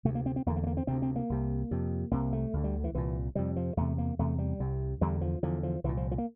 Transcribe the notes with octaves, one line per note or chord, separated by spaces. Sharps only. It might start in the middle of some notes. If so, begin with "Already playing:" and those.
D2 C3 A3
A#3
C4
C4
E2 D3 A#3
A#3
A3
A#3
C4
D2 C3 C4
C4
A#3
C2 C3
F2 C3
C2 C3 A#3
A3
D2 D3
G3
E3
C2 A#2 E3
F2 C3 G3
F3
E2 C3 A3
A#3
E2 C3 A3
G3
C2 C3
E2 D3 G3
F3
E2 D3 F3
F3
C2 A#2 E3
F3
F3
A#3